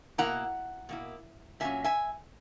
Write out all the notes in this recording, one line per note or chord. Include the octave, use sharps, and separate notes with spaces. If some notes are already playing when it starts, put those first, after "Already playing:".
B2 A#3 E4 F#5 A#5
B2 A#3 E4
A#2 F#3 C#4 E5 G#5
E5 G#5